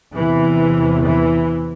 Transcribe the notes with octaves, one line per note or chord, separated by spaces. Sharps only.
E2 C3 E3
E3